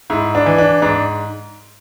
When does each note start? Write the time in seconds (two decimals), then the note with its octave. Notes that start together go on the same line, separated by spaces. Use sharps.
0.10 G#2 E4
0.35 D4
0.46 E3
0.58 D4
0.82 G#2 D4